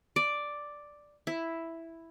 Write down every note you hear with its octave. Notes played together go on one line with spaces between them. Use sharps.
D5
E4